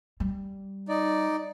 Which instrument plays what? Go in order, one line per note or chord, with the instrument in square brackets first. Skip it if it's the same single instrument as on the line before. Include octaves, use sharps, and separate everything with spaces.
[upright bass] G3
[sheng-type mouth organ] D#4 D5